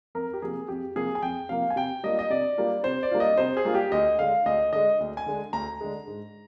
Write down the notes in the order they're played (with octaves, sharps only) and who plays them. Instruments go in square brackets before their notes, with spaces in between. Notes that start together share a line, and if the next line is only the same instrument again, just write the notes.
[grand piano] F2 A#4
G4
C3 F3 A#3 G#4
F2 G4
C3 F3 A#3 G#4
G#5
F2 G5
C3 F3 A#3 F5
G#5
C3 G5
G3 A#3 D4 F4 D#5
D#5
C3 D5
G3 A#3 D4 F4
C3 C5
D5
G3 A#3 D4 F4
D#5
C3 C5
G#4
G3 A#3 D4 F4
G4
D2 D#5
D3 G#3 F5
D2 D#5
D3 G#3 D#5
D2
G#5
D3 G#3
D2 A#5
D3 G#3
G#2